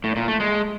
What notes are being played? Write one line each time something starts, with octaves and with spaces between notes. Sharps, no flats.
A2
A#2
A3
G#3